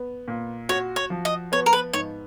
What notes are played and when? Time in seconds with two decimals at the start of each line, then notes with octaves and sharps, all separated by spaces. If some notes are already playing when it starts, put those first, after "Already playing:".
Already playing: B3
0.28 A#2
0.69 F#4 C#5
0.96 C#5
1.10 F3
1.25 D#5
1.52 B3 C#5
1.66 A#4
1.73 B4
1.93 G#2 C#5